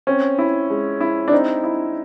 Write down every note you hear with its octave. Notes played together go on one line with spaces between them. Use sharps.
C4 C#4
E4
G#3
E4
D4
C4 D#4
E4